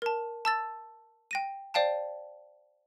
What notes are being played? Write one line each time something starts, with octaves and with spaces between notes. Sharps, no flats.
A#4 A5
A5 E6 A6
G5 A#6 D#7
C5 D5 F5 G5 A5